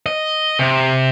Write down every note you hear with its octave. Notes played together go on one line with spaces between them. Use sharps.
D#5
C3